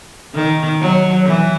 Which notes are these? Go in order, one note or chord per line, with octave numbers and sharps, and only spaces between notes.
D#3
F#3
E3